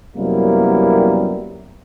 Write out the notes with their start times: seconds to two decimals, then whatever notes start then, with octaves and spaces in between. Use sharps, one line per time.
0.16 F#2 C3 G3 A#3 B3 E4